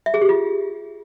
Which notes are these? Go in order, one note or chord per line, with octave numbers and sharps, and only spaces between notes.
E5
G#4
G4
F4